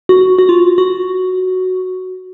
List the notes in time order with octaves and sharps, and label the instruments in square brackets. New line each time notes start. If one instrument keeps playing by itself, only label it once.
[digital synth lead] F#4
F#4
F4
F#4